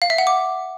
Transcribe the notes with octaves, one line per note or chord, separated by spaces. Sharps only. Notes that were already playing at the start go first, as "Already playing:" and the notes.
F5
E5
F#5
D6